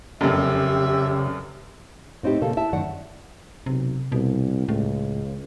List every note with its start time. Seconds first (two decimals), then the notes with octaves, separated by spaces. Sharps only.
0.21 F1 F#2 C#3 G4 E5
2.23 A2 C4 D#4 E4 G4
2.41 A#2 C#3 A#3 A4
2.57 E4 E5 A5
2.72 F#2 A2 D#3 D5 F#5
3.66 B1 C3
4.12 C2 B2
4.69 C#2 A2